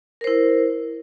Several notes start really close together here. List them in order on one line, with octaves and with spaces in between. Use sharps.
A#4 C5 E4